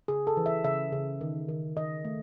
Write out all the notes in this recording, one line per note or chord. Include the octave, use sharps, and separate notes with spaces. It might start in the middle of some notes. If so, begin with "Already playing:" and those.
C#3 G#4
A4
E3
E5
C#3 E5
C#3
D#3
D#3
D#3 D#5
A3